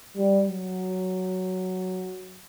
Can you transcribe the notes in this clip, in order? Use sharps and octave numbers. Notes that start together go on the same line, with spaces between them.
G3
F#3